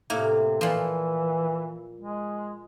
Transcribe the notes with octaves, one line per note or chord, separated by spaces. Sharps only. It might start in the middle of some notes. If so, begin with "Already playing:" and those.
A2 C3 A#3
A#2 E3 F3
G#3